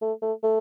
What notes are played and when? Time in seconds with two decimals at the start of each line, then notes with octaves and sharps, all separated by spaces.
0.02 A3
0.22 A3
0.43 A3